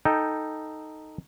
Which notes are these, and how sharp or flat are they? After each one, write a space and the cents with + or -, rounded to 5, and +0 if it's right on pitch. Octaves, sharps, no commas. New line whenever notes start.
D#4 +0 A4 +5 G5 +0